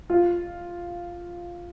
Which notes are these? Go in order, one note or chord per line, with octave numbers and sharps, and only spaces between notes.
F4